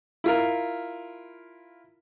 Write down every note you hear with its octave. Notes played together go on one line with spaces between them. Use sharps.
E4 F4 A#4